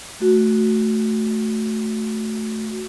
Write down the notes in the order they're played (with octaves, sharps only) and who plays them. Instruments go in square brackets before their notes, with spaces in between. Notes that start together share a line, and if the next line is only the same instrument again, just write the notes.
[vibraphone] A3 F#4